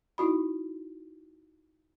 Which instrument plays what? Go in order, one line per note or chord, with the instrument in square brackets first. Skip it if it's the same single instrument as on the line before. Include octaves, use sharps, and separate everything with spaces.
[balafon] D#4 E4 F#4 B5